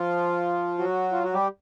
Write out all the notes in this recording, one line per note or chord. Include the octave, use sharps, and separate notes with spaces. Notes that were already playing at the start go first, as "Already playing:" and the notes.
Already playing: F3 F4
F#3 F#4
F4
F#4
G3 G4